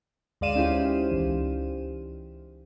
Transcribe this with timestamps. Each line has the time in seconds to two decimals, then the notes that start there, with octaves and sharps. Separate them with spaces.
0.41 D2 G#3 D5 F5 D#7 E7
0.55 C#4 D#4 E4 G4 C5
1.12 C#2 E3